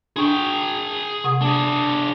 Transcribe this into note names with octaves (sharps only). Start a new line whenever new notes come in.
D4 G#4 G5 C#6
C3 F#5 D#6
D4 G#4